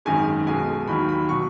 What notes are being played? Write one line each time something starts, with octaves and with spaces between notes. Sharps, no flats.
G#1 F#2 D#3 G#3 G#5
B1 B2 G#3 G#5
D#2 D#3 F#3 B5
B5
B2 F#3 C#6